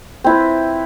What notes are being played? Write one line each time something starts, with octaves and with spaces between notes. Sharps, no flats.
C4 E4 B4